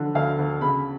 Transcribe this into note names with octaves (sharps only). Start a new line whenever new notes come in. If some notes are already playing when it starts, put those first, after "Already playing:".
Already playing: D3 F3 F#3
D2 F5
D2
C#3 B5